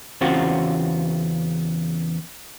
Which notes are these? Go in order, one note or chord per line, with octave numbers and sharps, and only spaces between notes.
E2 C#3 C4 F4 F#4